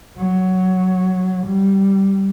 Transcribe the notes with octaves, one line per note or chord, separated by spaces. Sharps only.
F#3
G3